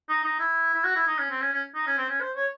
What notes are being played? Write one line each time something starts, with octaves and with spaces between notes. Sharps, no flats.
D#4
D#4
E4
E4
F#4
E4
D#4
C#4
C4
C#4
C#4
D#4
C#4
C4
C#4
C5
C#5